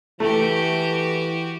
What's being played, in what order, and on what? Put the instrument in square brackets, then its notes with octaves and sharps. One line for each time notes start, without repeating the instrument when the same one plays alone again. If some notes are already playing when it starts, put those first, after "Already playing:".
[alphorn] E3 [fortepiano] A3 [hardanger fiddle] F#4 G4